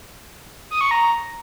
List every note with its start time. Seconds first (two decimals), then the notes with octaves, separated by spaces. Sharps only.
0.71 D#6
0.81 C#6
0.91 A#5